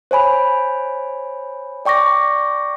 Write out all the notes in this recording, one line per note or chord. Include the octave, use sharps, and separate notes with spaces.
C5 C#5 G#5 B5
D5 G5 C#6 D6 A#6